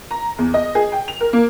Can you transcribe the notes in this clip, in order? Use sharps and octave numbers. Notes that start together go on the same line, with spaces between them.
A#5
E2
D#5
G#4
G5
F7
A#4
A#3